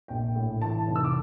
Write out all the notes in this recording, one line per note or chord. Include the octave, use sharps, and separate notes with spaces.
A#1 G5
A2
E3 A5
F1
E6
D6